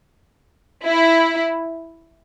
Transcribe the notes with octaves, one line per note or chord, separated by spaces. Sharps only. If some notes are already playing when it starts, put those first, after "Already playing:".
E4